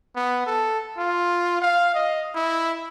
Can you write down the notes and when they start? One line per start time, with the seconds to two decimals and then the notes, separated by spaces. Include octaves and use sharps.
0.16 B3
0.47 A4
0.98 F4
1.62 F5
1.95 D#5
2.35 E4